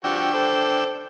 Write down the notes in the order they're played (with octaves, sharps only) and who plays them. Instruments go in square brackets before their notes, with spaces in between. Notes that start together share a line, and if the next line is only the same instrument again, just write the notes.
[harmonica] F3 F#4 G4 [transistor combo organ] D4 G5 E6
[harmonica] A4 C5